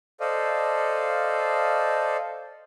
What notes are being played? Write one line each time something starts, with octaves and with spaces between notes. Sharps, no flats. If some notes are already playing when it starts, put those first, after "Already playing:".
A4 C5 D5 D#5 F5